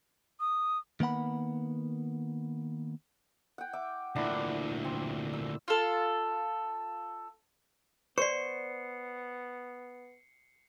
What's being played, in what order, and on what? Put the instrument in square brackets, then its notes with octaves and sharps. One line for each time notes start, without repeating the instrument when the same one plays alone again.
[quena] D#6
[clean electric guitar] D#3 A#3 B3 F#5 B5
[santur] F#5 G5
E5 D6
[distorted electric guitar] D2 A#2 [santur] D4 E4
[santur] C4
E6
[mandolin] F4 A4
[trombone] B3 [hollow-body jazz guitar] C5 [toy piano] D5 C#6 [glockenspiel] C7 C#7